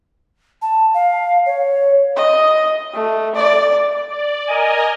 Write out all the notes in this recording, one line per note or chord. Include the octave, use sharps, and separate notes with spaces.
A5
F5
C#5
D#5
A3
D5
D5
A#4 D#5 G#5